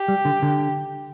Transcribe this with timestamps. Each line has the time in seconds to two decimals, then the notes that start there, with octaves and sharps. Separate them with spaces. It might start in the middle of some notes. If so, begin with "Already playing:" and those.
Already playing: G4
0.08 G3
0.25 D3
0.42 D3